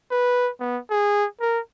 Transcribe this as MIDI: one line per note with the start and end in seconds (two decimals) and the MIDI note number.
0.11 0.50 71
0.60 0.78 59
0.90 1.26 68
1.41 1.59 70